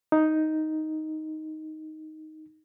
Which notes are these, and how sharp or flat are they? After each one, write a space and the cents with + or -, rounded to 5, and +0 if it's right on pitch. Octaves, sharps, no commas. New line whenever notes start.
D#4 +5